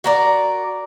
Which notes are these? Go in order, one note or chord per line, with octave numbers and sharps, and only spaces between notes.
F#4 A#4 D5